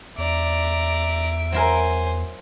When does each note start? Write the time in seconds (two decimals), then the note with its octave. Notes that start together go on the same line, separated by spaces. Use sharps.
0.18 E2 D5 E5 A#5 D7
1.52 F#3 E4 A#4 C5 G#5